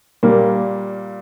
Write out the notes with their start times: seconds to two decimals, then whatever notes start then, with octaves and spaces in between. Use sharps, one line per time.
0.23 A#2 G3 A#3